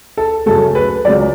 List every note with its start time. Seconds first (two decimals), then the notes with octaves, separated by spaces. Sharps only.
0.17 A4
0.46 F#2 C#3 F#3 A3 A4
0.75 B4
1.05 C#2 C#3 F#3 D5